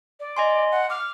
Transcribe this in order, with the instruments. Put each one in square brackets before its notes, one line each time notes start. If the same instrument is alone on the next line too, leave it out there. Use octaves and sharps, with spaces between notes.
[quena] D5
[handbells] D#5 G#5 C6
[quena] F#5
[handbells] D6 [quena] F6